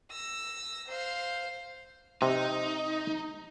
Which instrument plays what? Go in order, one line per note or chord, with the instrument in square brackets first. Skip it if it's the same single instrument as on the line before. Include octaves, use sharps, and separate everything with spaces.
[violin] E6 A#6
C5 F5
[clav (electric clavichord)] C3 [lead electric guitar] D#4